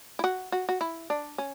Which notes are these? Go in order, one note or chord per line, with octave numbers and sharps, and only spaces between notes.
E4
F#4
F#4
F#4
E4
D4
C#4